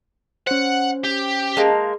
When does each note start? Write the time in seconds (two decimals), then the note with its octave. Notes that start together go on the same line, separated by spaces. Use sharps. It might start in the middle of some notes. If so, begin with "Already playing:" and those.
0.47 C#4 C5 F#5
1.04 G4
1.57 G#3 A#3 D#4 F5 A5